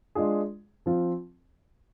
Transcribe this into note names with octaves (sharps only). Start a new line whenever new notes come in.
G#3 D4 F4 G#4
F3 C4 F4